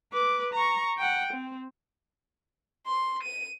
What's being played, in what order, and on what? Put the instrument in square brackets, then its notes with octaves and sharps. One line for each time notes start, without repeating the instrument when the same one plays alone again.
[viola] B4 D6
A#5 C#6
F#5 G5
C4
[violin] C6
D#7